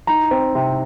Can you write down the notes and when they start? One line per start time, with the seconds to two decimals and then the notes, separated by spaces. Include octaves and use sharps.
0.07 D#4 A#5
0.31 C4
0.55 C3